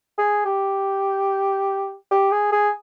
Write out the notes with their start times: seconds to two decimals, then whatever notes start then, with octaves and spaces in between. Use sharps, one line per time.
0.18 G#4
0.45 G4
2.11 G4
2.32 G#4
2.52 G#4